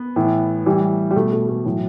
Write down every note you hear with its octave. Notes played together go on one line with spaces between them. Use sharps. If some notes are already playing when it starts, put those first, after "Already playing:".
Already playing: B3
A2 E3
A2 E3 G3
G3
B2 A3
A3
A3
A2 E3 F#3